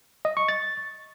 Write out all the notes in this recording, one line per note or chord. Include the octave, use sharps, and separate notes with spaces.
D#5
C#6
A6